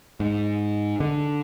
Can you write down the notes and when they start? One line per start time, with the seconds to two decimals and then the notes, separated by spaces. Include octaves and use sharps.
0.20 G#2
1.00 D3